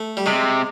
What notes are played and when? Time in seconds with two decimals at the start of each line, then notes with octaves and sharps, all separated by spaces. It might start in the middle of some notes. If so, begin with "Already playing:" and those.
Already playing: A3
0.17 G3
0.26 C3 G#3